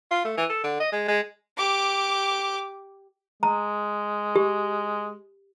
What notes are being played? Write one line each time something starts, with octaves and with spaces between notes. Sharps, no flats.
F4
A3
E3
A4
D3
D#5
G#3
G#3
G4 D6
G#3 A#5
G4